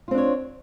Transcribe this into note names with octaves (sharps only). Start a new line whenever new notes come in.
C4 D4 F4 C#5